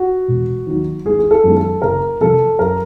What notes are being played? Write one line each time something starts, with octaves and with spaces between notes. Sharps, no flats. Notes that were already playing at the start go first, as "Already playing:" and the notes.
Already playing: F#4
E1
D#2 D#3 F#3
G#1 G#4
G#4
A4
F#2 D#3 G#3 B3
A4
F#1 A#4
F2 C3 A4
F#2 A#4